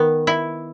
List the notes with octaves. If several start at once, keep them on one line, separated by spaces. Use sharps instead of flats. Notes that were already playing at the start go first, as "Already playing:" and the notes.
Already playing: D#3 B3
E4